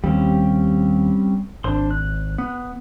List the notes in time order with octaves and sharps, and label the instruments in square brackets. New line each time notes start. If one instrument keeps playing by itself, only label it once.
[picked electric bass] D#2 [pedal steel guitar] G3 C4 C#4
[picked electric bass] G#1 [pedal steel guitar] D4 C5 C6
[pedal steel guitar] F#6
[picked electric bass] B3